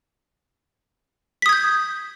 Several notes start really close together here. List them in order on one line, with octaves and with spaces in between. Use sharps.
B6 D#6 G#6 G6